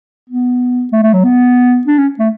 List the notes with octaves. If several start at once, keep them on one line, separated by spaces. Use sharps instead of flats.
B3
A3
A3
F#3
B3
D4
C#4
A3